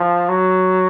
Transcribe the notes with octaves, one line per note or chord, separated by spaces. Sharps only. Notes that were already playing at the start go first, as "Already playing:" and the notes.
Already playing: F3
F#3